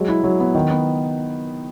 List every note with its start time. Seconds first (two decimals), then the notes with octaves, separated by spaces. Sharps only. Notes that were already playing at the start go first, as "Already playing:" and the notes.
Already playing: F#3 G#3
0.08 E4
0.24 F#3
0.40 B3
0.55 D#3
0.71 B3